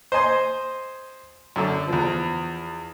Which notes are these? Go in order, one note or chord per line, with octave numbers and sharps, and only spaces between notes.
C5 D#5 G#5 C6
F#2 D3
E2 F3